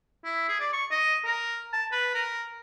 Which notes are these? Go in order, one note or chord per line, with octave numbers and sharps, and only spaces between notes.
E4
G#4
D5
C#6
D#5
A#4
A5
B4
A#4